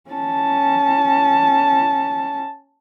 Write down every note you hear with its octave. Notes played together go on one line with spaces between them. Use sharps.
C#4 A5